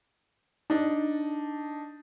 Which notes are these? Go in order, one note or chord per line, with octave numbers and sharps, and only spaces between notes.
D4 D#4